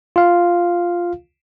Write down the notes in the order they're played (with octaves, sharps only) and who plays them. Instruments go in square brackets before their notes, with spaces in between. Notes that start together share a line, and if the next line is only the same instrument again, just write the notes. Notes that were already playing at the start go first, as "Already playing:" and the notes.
[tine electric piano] F4 F5